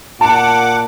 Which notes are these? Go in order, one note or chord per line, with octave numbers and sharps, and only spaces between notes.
A#2 F#5 A5 D6